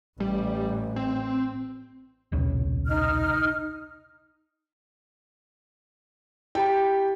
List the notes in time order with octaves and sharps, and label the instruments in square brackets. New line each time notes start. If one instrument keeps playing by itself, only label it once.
[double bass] A1 [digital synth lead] G3
[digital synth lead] C4
[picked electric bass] D#1 B1 C#3
[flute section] D#4 F6
[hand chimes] E4 G4 B5 [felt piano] G5